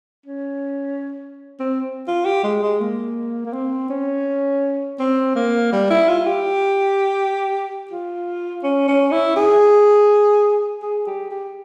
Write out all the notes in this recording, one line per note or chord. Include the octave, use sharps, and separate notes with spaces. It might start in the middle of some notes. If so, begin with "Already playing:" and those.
C#4
C4
F4
G4
G#3
G#3
A#3
A#3
C4
C#4
C4
A#3
G3
E4
F4
G4
F4
C#4
C#4
E4
G#4
G#4
G4
G4